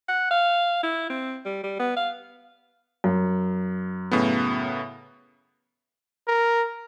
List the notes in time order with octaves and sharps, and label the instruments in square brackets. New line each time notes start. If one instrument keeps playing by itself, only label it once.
[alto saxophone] F#5
F5
E4
C4
G3
G3
B3
F5
[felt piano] F#2
[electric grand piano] A2 C#3 B3
[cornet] A#4